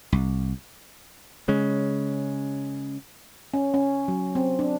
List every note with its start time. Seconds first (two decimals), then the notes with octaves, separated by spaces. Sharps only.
0.12 C2
1.48 C#3 G#3 C#4
3.54 C#4
3.74 C#4
4.08 F#3
4.35 C4
4.59 D4